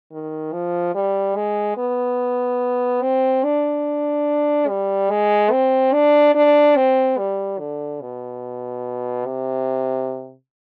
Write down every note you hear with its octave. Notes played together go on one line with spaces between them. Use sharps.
D#3
F3
G3
G#3
B3
C4
D4
G3
G#3
C4
D4
D4
C4
G3
D3
B2
C3